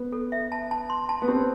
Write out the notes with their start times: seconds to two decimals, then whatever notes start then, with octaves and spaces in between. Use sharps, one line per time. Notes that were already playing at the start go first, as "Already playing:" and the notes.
Already playing: B3
0.12 A4
0.32 E5
0.52 A5
0.71 A5
0.90 C6
1.09 A5
1.22 B3
1.28 C4 G4